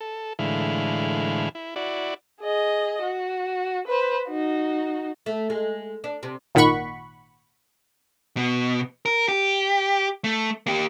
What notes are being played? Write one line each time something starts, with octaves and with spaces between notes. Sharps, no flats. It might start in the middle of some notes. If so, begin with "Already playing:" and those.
A4
A2 D3 E3 G#3 E4 F5
E4
E4 F#4 D5
G#4 D#5
F#4
B4 C5
D#4 F#4
A3
G#3
D4
C3
G#1 A#2 D#3 F#5 B5 C#6
B2
A#4
G4
A3
A#3 G4